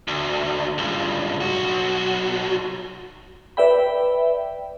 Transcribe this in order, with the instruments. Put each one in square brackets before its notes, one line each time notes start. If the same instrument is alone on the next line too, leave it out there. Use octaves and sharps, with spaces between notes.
[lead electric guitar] D2
C#2 G2
B1 F#4
[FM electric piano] B4 D5 E5 G5 B5